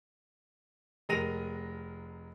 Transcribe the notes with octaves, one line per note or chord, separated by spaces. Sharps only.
F1 G#3 A#4 A#6 D#7 F7